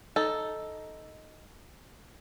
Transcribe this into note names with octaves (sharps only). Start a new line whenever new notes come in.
D#4 A4